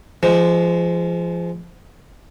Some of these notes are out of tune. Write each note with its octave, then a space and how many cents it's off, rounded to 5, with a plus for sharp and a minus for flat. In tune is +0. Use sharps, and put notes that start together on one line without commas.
F3 -25 G#3 +0